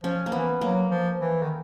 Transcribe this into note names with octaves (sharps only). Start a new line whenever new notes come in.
F3 C#4
A#3
E3 B3
F#3 A#3
F3
E3
D#3